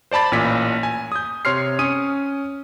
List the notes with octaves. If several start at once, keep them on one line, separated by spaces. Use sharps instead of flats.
C5 D5 A5 B5 A6
A1 A#2 B6
G#5
D#6 G6
C3 C#5 C6 F6 C7
C#4 D#6 D#7